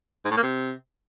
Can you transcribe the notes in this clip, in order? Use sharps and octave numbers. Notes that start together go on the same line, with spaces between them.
G#2
A2
A#3
C3